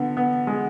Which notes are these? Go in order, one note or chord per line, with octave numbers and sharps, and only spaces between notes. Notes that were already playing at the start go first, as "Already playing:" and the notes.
Already playing: D3 B3
B3
G#3